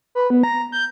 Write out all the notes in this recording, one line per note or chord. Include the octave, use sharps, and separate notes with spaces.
B4
B3
A#5
G6